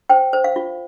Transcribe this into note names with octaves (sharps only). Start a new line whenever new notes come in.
C5 G5
C5
F5
F4